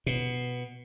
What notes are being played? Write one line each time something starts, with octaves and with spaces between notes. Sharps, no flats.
B2